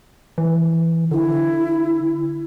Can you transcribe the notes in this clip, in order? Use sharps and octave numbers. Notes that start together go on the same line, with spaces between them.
E3
D3 E4